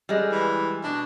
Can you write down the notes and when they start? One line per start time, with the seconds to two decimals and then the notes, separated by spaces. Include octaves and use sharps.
0.09 G3 G#3
0.32 E3
0.84 B2 D4